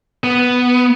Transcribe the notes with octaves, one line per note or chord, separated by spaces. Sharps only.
B3